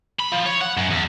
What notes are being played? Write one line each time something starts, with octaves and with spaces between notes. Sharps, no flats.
B5
F3
C#5
F#5
F#2
E2